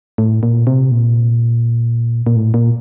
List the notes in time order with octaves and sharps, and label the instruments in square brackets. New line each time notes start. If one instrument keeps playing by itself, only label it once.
[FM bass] A2
A#2
C3
A#2
A#2
A2
A#2